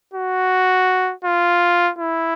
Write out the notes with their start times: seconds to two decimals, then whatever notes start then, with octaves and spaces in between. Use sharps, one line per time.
0.14 F#4
1.25 F4
1.99 E4